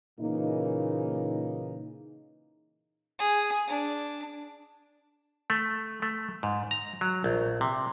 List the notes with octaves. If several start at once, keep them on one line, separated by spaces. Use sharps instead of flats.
A#2 C#3 E3 A#3 D#4
G#4
D4
A3
A3
G#2
A#5
F#3
A#1
C3